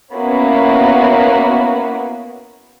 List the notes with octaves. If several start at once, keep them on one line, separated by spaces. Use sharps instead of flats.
A#3 B3 C#4 E4 F#4 B4